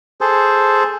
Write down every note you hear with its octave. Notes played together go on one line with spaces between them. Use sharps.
G#4 A4 C5